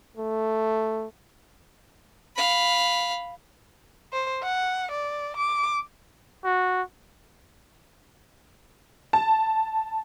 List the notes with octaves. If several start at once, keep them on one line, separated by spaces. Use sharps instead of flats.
A3
F5 B5
C5
F#5
D5
D6
F#4
A5